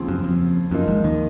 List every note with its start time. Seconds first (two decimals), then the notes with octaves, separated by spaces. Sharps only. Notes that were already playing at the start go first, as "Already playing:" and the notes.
Already playing: D#2 C#3 F3 C4
0.09 F#2
0.24 F2
0.71 F#2 F3 A#3 D#4
0.87 G#1 G#2
1.04 D#2 D#3